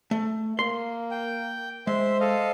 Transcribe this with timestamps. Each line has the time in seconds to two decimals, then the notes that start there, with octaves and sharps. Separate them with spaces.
0.11 A3
0.59 A#3 C6
1.11 G5
1.87 G#3 C5 E5 C6
2.20 A4 D#5 F5